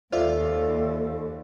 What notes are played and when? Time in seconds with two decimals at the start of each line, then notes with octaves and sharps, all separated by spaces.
0.12 D#2 F4 A4 C5 D5 E5